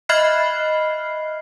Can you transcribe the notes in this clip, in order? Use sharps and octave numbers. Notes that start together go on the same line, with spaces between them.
D#5 E5 B5 F6 F#6 C7